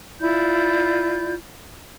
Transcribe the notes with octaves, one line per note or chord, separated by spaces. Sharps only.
E4 F4 D5 G6